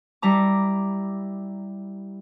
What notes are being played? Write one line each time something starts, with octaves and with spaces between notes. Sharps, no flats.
G3 E4 A#5 D6